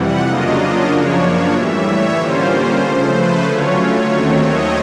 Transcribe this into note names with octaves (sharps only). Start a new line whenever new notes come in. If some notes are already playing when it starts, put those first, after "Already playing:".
Already playing: F2 C3 E3 G3 F#5
C#3 F#3 A#3 D4 F4 D#5
F#2 C#3 F3 A#3 D4 C#5
A2 E3 G3 E5
C#5
D3 G3 A#3 C#4 F4 C5
C#3 F3 A3
B4
D3 F#3 A3 C#4 F4 C#5
C#5
D#2 D#3 F#3 A3 C4
D#5